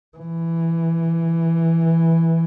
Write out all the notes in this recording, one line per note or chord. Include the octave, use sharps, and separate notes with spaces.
E3